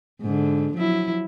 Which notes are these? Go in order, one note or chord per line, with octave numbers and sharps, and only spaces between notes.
G#2 D3
F3 F#3 E4